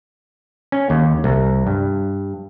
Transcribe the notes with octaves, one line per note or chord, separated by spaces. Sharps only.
C#4
D#2
C2
G2